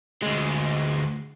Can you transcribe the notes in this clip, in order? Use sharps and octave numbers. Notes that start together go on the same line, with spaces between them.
D2 G#3